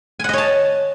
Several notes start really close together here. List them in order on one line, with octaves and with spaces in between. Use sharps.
G#5 F#5 D#5 C#5 A5